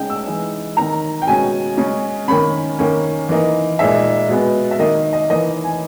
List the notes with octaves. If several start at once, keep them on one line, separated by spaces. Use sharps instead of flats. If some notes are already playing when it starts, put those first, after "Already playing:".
Already playing: C#3 G#3 D#4 G5
E6
E3 G#3 D#4
D#3 A#3 D#4 A#5
G5
B2 G#3 C#4 G#5
C#3 G#3 C#4
D#3 A#3 C#4 B5
D#3 A#3 C#4
E3 A#3 D#4
A#2 G#3 D#4 E5
B2 G#3 B3
E5
D#3 A#3 D#4 D#5
D#5
E3 A#3 D#4 D#5
G#5